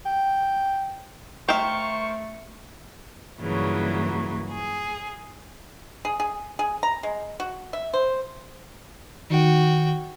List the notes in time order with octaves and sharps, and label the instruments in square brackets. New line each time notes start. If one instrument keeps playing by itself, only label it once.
[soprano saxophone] G5
[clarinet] A3 [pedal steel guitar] A#4 C5 F5 [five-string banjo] E5 G5 [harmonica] C#6
[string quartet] G2 A#2 C#3 E3 F#3
G#4
[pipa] G#4
G#4
G#4
A#5
G#3
F#4
E5
C5
[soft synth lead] D#3 [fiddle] F#4 G5